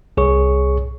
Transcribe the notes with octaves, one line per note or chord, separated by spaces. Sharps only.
C2 G#4 C#5 C#6